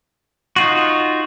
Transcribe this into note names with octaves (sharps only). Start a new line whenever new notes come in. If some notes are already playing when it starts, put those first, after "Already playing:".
D#4 F4 F#4